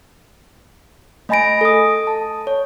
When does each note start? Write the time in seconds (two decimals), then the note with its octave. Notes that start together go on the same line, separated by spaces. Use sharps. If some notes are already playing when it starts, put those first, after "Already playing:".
1.29 A3 D#5 G#5 B5 A#6 D7
1.61 A4 D#6
2.07 A5
2.47 C#5